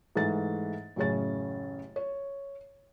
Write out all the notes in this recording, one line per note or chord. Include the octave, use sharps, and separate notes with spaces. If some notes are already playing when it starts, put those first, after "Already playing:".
G#2 E3 A3 A6
A1 F#2 C#3 C#5 A6
C#5